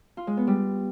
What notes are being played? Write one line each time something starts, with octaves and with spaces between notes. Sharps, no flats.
F4
G#3
B3
G3